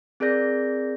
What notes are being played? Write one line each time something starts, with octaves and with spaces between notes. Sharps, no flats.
C4 G#4 A#4 D5 G6 A#6